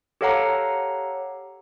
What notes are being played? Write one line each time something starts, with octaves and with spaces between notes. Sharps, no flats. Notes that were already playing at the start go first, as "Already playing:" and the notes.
G4 A4 C#5 F5 F#5 A#5